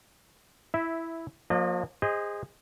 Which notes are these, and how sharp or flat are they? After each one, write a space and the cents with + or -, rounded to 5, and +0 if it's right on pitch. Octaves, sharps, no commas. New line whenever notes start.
E4 +0 E5 -10
F3 +40 A#3 +0 D#5 -35
G#4 -30 C5 -10 D#5 +5